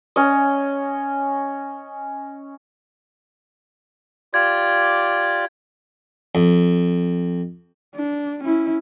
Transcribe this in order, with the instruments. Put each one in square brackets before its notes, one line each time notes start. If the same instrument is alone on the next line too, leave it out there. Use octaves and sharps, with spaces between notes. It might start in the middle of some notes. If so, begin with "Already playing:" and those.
[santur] C#4 D#5
[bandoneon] F4 G4 D5 [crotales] G#6
[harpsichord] F2
[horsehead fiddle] D4
C#4 E4